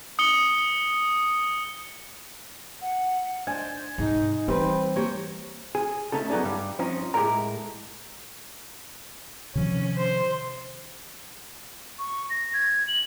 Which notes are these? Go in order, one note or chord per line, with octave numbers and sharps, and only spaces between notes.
D#6 C#7 G7
F#5
D4 C5 G#5
G#2 C3 D#4
E3 G3 C4 G4 B4
A#3 G4 C#5
G#4
A3 C#4 D#4 A4
F#3 B3 D#4 G#4 D5
G2 G3
F3 C4 C#4 D#4
A2 G#3 G4 G#4 A#4 A#5
C3 D#3 F3 C#4
C5
C#6
A#6
G#6
F#7